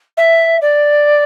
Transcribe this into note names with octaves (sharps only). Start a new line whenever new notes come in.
E5
D5